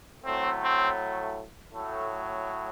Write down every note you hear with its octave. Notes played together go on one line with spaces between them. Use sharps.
A2 F#3 A3 C4
C4
A2 F#3 A3